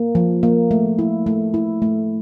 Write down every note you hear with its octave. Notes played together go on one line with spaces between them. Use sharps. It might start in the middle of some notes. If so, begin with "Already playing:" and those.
Already playing: A#3
F3
A#3
A3
E4
A3
E4
A3